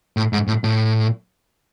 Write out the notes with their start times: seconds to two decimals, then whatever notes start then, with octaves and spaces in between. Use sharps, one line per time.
0.17 A2
0.33 G#2
0.48 A2
0.64 A2